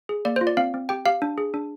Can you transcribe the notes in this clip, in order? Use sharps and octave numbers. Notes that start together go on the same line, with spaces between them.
G#4
A#3 D5
C5
F4
D5
C4 F5
C4
G4 G5
G4 F5
D4
G#4
D4